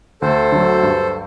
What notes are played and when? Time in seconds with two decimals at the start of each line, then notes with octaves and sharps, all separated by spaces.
0.22 D2 A4 C5
0.52 D3 F#3
0.83 G2